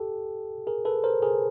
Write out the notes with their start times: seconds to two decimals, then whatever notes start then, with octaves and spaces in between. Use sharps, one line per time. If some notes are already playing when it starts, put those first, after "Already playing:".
Already playing: G4 A4
0.67 G#4 A#4
0.85 A4 B4
1.04 A#4 C5
1.22 G#4 A#4